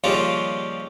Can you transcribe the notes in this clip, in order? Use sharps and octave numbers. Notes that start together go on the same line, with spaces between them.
D#2 C#3 F3 G3 F4